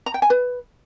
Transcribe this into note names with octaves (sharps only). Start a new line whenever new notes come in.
A#5
G5
G#5
B4